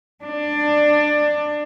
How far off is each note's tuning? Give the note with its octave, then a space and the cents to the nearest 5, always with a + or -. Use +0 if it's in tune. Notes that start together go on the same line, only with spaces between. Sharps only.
D4 +15